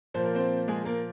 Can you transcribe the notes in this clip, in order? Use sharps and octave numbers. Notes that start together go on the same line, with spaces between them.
A#2 F3 A#3 C5
A#4
C4 C5
G#3 G#4
A#3 A#4